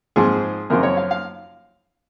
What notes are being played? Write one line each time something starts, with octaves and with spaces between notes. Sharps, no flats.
G#2 F3 C4 G#4
F#2 C#3 F3 C4 A#4
C#5
F5
F5